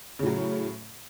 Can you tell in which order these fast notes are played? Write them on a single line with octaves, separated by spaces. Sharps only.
C#3 A2 F#3